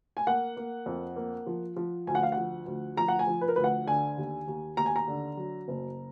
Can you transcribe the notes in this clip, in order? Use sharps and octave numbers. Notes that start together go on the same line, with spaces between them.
G#5
A#3 F#5
A#3
F2
A#3
F3
F3
D2 G#5
F#5
F5
F#5
F3
D2
F3 A#5
F#5
G#5
F3
B4
A#4
D2 B4
F#5
D3 G#5
D#2
D#2
D#2 A#5
G#5
A#5
D3
F#3
F#1